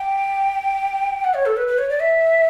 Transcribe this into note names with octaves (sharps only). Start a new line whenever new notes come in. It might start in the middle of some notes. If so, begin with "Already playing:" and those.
Already playing: G5
F#5
C#5
A4
B4
B4
C#5
D5
E5